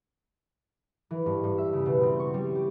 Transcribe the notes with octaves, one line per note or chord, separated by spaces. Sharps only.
E3
G2
G2
E5
C#3
B2
C4
C#6
G3
G4